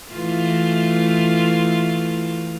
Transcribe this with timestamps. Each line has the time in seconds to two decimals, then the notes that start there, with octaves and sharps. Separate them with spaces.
0.13 E3 A3 F4